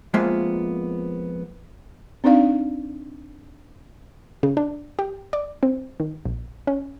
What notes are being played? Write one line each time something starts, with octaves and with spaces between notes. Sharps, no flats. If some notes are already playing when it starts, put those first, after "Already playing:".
F2 G#3 A#3 B3 F4 E5
C4 D4 D#4 D5 F5
C#3
D4
G4
D5
C4
D#3
A#1
C#4